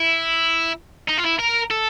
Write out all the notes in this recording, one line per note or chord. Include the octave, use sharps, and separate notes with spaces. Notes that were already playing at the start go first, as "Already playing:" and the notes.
Already playing: E4
D#4
F4
E4
A#4
A4